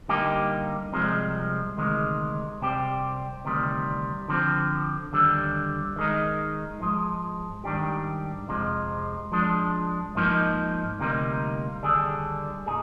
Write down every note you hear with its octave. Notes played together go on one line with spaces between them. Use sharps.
D3 G3 A#3 D#4 G4
C2 C3 F3 G#3
D2 C3 D#3 G#3 D#4
C2 C3 G3 C4 G4
D2 C3 D#3 G3
D3 F3 C4
D#2 D3 G3
D#3 G#3 D#4
G#2 F3 G#3
G#2 D#3 G3 D4 G4
F2 C3 F3 G#3
F3 G#3 D4
G#2 F3 A#3 D#4
D2 C3 G3 A#3 D#4
D#2 D3 G3 D4 G#4
A#2 D#4 G#4